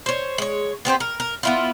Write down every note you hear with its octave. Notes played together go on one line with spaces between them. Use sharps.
C5 C#5
G#3 C#5
B3 C4 G4 C5
A#4
A#4
B3 E4 F4